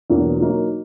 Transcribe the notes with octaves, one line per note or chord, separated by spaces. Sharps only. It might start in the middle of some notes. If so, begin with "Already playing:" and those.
E2 B2 F#3 A#3 D4
F#3 A#3 D#4